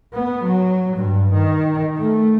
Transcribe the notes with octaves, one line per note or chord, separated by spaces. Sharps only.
B3
F#3
G2
D#3
A3